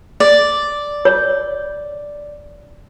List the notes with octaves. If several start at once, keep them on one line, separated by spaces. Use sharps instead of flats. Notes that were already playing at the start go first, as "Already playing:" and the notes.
D5
C#5